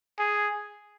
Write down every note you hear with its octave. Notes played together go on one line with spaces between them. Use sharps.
G#4